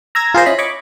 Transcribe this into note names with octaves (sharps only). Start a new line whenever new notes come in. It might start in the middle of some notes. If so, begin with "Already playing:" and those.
A#5 E6 G#6 A#6
F4 G#4 A#4 C5 A#5
C#4 E4 D#5 B5
C#5 D#5 B5 C#6 D6